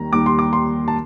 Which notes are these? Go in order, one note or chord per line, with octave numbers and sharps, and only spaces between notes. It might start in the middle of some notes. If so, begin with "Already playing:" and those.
Already playing: D#2 D#3 G3 A#5
D#2 D#3 G3 D6
C6
D6
C6
A5